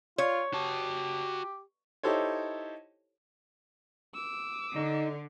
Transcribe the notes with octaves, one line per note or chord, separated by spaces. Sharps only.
F4 C#5
F#4 G4 A5
D#4 E4 G4 A4 C5 C#5
D6 E6
D3 D#4